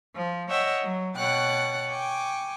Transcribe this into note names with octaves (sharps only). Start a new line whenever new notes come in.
F3
C#5 D#5 E5 F#5 G5
F#3
B2 C#5 F#5 G5 F#6 A6
G5 G#5 C#6 D6